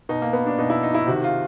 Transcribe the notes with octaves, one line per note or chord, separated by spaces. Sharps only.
B2 D#4
A#3
B3
D4
B2 D#4
E4
D#4
E4
C3 D#3 F#4
F4